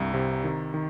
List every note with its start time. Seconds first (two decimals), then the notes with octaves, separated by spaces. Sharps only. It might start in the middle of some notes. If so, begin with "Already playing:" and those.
Already playing: C2 G2 A#5
0.14 C3
0.44 D#3
0.74 D#3